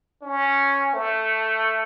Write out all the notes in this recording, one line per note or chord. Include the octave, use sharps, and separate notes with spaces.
C#4
A3